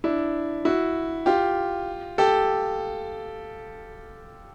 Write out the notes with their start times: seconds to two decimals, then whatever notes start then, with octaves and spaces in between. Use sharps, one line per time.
0.04 D4 E4
0.65 E4 F#4
1.26 F4 G4
2.18 G4 A4